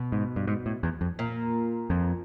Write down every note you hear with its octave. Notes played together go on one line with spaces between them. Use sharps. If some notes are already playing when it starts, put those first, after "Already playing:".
Already playing: B2
G#2
G2
G#2
A2
E2
F2
A#2
F2